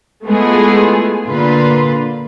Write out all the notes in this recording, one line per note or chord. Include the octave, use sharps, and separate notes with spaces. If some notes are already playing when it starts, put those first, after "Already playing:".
G#3 A3 B3 E4 F4 G#4
A#2 D3 F4 B4